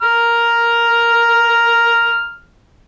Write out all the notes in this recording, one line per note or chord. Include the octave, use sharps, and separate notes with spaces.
A#5 F6